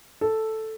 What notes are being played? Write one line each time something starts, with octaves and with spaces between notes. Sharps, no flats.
A4